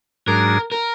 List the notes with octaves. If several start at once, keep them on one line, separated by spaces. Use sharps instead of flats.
G#2 F#3 D4 G#4 A#4
A#4